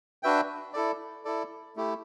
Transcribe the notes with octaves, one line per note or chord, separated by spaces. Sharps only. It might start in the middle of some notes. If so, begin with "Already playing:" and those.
D4 F#4 B4 E5 G5
E4 A4 D5
E4 A4 D5
A3 E4 G4